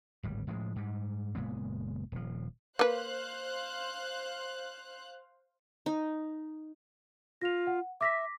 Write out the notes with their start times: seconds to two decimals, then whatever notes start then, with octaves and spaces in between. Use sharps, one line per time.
0.23 D1 G#1 G3
0.47 A2 F3 F#3 G#3
0.76 G#2 G3
1.35 F#1 A#2 G#3 B3
2.12 D#1 F3
2.79 A#3 B4 C5 F5 F#6
5.86 D#4
7.42 F4 A#6 F7
7.67 F#5
8.01 E5 D6 A#6 B6